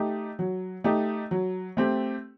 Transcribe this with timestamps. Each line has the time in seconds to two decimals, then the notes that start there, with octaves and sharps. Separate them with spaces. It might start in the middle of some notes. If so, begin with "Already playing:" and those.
Already playing: A3 D#4 G4
0.39 F#3
0.84 A3 D#4 G4
1.31 F#3
1.77 A3 C4 G4